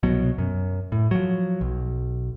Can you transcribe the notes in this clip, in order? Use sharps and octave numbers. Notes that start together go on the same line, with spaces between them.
C2 B2 F#3
F#2
A2
F3 F#3
B1